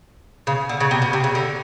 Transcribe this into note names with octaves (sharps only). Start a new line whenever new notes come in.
C#3
D3
C#3
C3
B2
C3
C#3
D3